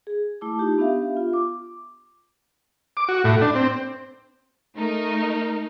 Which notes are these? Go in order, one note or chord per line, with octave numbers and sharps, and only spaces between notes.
G#4
A3 E4 A5 D6
D#4 F4 G4
B3 D4 G4 E5 F5
F4
D6
D6
F#4
A2
D4
C4
A3 D#4 A#4